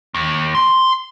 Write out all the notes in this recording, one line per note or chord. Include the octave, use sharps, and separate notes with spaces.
D#2
C6